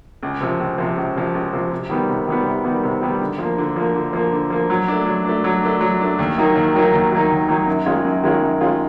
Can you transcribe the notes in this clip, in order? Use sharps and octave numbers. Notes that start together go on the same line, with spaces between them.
C#2
C3 F3
C#2
C3 F3
C#2
C3 F3
C#2
C3 F3
C3
D#3 G3 B3
C3
D#3 G3 B3
C3
D#3 G3 B3
C3
D#3 G3 B3
D3
F3 A#3
D3
F3 A#3
D3
F3 A#3
D3
F3 A#3
F#3
A3 D4
F#3
A3 D4
F#3
A3 D4
F#3
A3 D4
D#2
D#3 F#3 A#3 D#4
D#2
D#3 F#3 A#3 D#4
D#2
D#3 F#3 A#3 D#4
D#2
D#3 F#3 A#3 D#4
F#2
D#3 G#3 C#4 F4
F#2
D#3 G#3 C#4 F4
F#2
D#3 G#3 C#4 F4